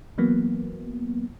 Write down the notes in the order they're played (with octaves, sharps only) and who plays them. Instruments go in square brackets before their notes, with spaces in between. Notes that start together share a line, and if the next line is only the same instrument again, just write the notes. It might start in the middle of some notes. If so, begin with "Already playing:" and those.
[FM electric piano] E3 F#3 A#3 B3